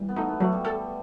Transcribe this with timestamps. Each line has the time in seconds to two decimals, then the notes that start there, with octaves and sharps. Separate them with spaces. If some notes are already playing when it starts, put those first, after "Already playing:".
Already playing: E3 G3
0.09 B3
0.16 A3 D#4
0.29 B3
0.40 F#3 A3
0.52 G3
0.65 A4